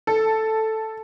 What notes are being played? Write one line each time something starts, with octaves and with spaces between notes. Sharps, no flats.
A4